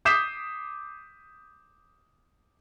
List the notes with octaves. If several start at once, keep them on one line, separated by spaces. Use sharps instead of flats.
D6 D#6 G6 B6 C7 E7